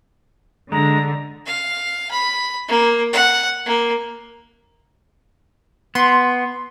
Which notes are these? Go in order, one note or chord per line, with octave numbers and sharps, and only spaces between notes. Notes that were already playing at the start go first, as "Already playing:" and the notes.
D3 G#3 A#5
F5
B5
A#3
F#5
A#3
B3 C6